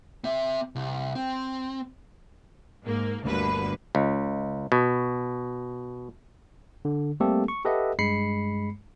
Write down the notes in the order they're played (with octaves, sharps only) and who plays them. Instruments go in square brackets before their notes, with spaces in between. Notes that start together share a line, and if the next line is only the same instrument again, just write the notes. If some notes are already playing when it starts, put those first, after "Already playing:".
[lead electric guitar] C4 E5
C2
C4
[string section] G#2 A#3
G1 D2 G2 D3 A#3 B4
[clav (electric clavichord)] C#2
B2
[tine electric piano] D3
G3 A3 A#3 C4 G4 A4
C#6
G4 A4 B4 D#5 E5 F#5
G2 G#3 B5 C7 C#7